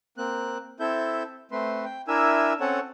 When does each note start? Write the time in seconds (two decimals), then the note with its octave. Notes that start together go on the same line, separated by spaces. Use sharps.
0.18 A#3 C4 F#6
0.80 C4 E4 A4 E5 G6
1.52 A3 C4 B4 C6
1.85 G5
2.08 D4 E4 A#4 E5 G#5 E6
2.60 C4 C#4 A4 C#5 F#5